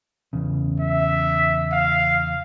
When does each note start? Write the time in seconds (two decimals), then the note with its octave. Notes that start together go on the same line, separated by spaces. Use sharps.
0.33 E2 C#3
0.80 E5
1.72 F5